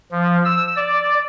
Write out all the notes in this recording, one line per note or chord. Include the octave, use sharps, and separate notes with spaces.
F3
E6
D5